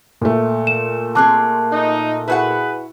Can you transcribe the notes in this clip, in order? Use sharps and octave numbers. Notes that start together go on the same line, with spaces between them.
A#2 A3
E7
A#3 C4 G#4 A5 D6 F#6
D#4
E4 F#4 G#4 B4 F#5